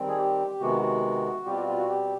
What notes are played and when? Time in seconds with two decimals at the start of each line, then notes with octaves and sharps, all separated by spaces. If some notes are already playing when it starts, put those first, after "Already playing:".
Already playing: D#3 G3 C4
0.08 G#4
0.18 G4
0.60 C3 D#3 G#3 B3 F#4
0.82 F#4
1.46 B2 G3 C4 F4 G4
1.57 F#4
1.67 F4
1.78 F#4
1.89 G4